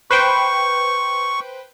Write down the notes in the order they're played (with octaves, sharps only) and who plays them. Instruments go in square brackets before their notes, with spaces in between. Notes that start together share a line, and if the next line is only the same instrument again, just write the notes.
[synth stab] B4 C5 G5 [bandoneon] C#6